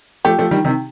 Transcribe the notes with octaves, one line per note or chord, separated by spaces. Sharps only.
F3 A3 G4
F3 A3
D#3 G3
C3 D#3